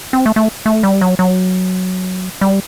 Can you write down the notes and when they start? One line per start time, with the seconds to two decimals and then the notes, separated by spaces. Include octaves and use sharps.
0.13 C4
0.26 A3
0.36 A3
0.66 A3
0.83 G3
1.01 F#3
1.19 F#3
2.41 G3